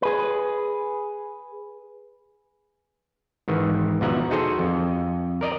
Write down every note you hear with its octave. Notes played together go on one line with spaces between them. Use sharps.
G#4 B4
G#2 D#3 E3
E2 B2 F3 E5 F#5 A#5
D#4 F#4 G#4 A4 C5
F2
A#4 D5 D#5 A#5